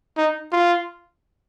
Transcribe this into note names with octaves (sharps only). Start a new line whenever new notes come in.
D#4
F4